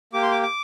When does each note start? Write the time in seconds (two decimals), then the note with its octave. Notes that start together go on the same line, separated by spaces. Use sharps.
0.13 A#3 G4 D6
0.22 C6
0.31 D6
0.43 D6